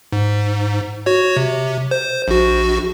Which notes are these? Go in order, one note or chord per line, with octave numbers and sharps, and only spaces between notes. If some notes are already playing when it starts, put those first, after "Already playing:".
G#2
F#4 C#5
C3
C5
A#1 F#4